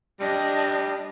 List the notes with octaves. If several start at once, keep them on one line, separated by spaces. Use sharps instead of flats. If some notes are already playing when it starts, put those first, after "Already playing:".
G3 D4 D#5